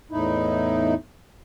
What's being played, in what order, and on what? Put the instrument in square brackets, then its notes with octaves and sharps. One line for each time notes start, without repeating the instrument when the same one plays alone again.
[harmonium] E2 A2 D#4 E4